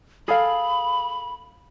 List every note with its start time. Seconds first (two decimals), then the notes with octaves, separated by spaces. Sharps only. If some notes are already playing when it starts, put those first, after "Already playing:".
0.28 G#4 A4 F5 B5